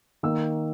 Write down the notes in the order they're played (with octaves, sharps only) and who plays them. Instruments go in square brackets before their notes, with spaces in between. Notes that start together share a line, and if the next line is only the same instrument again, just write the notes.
[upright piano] D#3 A#3 E6